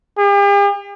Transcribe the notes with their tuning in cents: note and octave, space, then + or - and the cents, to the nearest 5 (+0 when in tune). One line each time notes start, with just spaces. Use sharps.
G4 +45